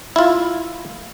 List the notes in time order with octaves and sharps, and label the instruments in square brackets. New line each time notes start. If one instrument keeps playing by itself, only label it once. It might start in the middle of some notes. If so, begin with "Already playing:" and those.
[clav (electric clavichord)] E4 F4